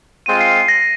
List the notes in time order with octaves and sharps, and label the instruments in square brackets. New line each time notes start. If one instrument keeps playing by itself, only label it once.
[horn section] G#3 C4 F4 [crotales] D#7
[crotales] C7
A#6